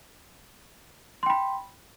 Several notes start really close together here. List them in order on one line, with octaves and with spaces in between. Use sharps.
C6 G5 B5